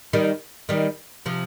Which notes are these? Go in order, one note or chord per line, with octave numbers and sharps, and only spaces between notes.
D#3 G3
D#3 G3
C3 F3